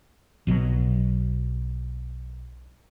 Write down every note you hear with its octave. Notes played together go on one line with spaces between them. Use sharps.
B1 B2 F3 F#3